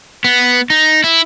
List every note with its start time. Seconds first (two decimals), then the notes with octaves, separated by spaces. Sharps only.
0.24 B3
0.70 D#4
1.04 E4